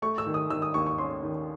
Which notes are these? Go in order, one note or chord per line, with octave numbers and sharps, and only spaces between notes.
A3 C#6
E6
D#3
D#6
D#3 E6
D#6
D#2 C#6
C#6
C#4 C6
D#3